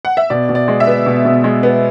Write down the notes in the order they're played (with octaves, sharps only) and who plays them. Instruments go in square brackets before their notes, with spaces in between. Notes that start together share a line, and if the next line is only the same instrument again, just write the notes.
[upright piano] F#5
E5
B2 D5
B2
D5
G#3
E5
B3
B2
B2
G#3
B3